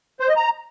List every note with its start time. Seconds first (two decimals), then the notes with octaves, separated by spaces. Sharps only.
0.20 C5
0.28 D#5
0.36 A#5